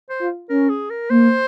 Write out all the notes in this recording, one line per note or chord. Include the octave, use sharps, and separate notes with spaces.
C5
F4
C#4 A#4
G#4
A#4
A#3 C5